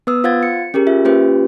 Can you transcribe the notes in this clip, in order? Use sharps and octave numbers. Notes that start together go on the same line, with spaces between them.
B3 B4 D#6 E6
F4 C5 F5 F#5 G#6 A6
C#7
C#4 G4 G#4 A#4
F4 E5
A#3 C#4 F4 G4 B4 C5